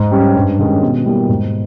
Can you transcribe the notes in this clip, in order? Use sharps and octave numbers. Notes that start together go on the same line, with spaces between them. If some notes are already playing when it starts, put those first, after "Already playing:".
Already playing: G#2
G3 C#4
G2
D#3 G#3 C#4
B2
G3 A#3 E4
G#2